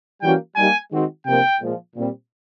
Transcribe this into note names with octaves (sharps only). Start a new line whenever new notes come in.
E3 G3 A#3 C#4 F#4 G5
G3 A#3 D#4 G4 G#5
D#3 G#3 C4 D#4 F#4
C3 F3 A#3 D4 G5
A#2 F3 G#3
A#2 G3 C4